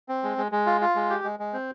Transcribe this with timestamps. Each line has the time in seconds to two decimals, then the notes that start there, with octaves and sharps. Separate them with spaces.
0.09 C4
0.23 G#3
0.38 G#3
0.52 G#3
0.66 F4
0.81 F4
0.95 G#3
1.10 G4
1.24 G#3
1.39 G#3
1.53 C4